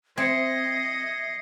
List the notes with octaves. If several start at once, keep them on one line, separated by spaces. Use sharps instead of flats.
C4 D#5 E5 G#6 C7 C#7